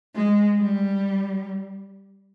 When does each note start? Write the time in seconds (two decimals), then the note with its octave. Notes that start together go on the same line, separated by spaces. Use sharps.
0.15 G#3
0.58 G3